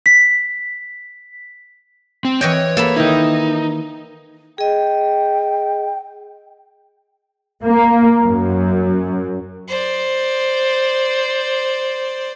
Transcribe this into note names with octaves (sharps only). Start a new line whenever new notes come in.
B6
C4
E3 C#5 D#5 G5
A#3 A4 A5 B5
D#3 D#4 E4
G#4 D#5 G5
A#3
F#2
C5 D5